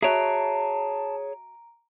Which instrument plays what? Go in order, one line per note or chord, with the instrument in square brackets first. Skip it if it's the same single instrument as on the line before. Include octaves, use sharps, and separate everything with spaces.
[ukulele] F#4 E5 [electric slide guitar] G#4 C#5 [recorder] A5 [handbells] A#5 D7